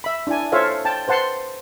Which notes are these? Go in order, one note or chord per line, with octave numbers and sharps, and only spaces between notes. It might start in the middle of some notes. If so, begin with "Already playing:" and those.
E5 B5
D4 E4 G#5
F4 A4 C5 C#5 E5 F5
G5 A5
B4 C5 F#5 A5 C6